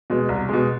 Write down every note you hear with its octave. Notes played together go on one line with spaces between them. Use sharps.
B2 G#3
C2
B2 G#3